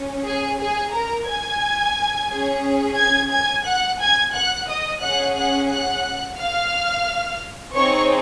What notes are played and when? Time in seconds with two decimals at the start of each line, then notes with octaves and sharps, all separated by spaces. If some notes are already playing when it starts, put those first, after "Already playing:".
Already playing: C#4
0.26 G#4 G#5
0.60 G#4 G#5
0.93 A#4 A#5
1.27 G#5 G#6
2.31 C#4 G#4
2.98 G#5 G#6
3.32 G#5 G#6
3.66 F#5 F#6
4.01 G#5 G#6
4.35 F#5 F#6
4.69 D#5 D#6
5.03 C#4 G#4 F#5 F#6
5.37 F#5 F#6
5.71 F#5 F#6
6.39 F5 F6
7.75 C4 D#4 G#4 C#5 C#6